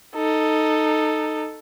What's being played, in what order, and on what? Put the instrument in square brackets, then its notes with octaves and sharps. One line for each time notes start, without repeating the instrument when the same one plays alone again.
[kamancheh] D#4 A4